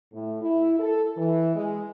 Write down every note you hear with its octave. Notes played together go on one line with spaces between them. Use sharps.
A2
E4
A4
E3
G#3